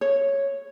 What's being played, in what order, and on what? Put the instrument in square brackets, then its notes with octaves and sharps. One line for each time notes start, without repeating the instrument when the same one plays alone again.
[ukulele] C#5